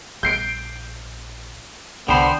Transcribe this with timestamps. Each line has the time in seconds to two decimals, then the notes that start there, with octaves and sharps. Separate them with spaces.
0.23 A#1 G6 C7 D7
2.08 C2 D3 B3 C5 G5 B5